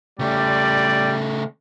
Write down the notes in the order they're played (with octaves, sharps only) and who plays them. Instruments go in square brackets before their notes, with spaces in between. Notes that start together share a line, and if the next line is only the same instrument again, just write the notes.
[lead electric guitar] C#3 A3 [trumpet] G3 [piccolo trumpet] D5